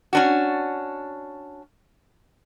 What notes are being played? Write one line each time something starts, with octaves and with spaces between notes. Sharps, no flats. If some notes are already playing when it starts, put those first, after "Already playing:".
C#4 D4 F#4